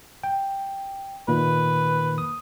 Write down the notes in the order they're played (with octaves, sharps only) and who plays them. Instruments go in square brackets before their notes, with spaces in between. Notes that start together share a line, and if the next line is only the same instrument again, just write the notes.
[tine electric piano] G5
[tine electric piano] A#2 D#3 A#3 [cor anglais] B4
[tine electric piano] D#6